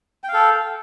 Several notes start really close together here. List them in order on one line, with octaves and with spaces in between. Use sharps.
G5 F5 A4